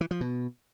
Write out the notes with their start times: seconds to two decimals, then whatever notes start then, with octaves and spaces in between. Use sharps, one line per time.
0.01 E3
0.11 F3
0.21 B2